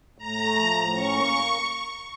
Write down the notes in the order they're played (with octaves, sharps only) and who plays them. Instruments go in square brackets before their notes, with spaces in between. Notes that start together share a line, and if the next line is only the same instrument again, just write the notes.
[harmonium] A2 [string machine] A#5
[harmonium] A3
F3
A2
[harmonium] C#4 [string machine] C#6
[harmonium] A#3